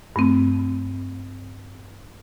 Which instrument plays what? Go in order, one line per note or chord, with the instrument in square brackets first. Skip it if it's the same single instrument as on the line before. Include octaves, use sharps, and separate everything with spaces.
[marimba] G2 A3 C4